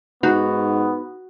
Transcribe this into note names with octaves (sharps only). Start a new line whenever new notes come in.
G#2 B3 D#4 F#4